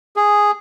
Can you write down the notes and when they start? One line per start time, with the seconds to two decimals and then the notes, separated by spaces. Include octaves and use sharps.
0.16 G#4